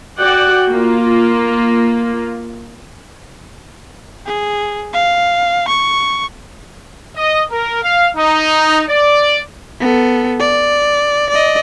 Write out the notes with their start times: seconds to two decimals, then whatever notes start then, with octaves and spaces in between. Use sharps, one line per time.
0.19 F#4 D5 F#5 G5
0.71 A#3 F4
4.26 G#4
4.93 F5
5.68 C#6
7.17 D#5
7.51 A#4
7.82 F5
8.16 D#4
8.89 D5
9.81 B3 A4
10.40 D5
11.30 D5 D#5